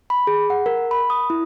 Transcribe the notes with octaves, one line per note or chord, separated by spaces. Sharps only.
B5
G#4
F#5
A#4
B5
D#6
E4